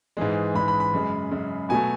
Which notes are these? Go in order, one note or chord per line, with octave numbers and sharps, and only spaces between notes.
G#2 E3 G#3
G#2 E3 G#3 B5
B5
B5
F#2 C#3 G#3
F#2 C#3 G#3
B2 F#3 A3 G#5